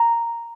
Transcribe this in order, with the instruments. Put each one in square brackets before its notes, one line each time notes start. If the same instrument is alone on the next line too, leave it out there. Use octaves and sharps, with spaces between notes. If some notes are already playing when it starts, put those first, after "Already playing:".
Already playing: [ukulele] A#5